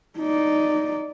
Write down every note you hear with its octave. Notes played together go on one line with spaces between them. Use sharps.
D#4 D5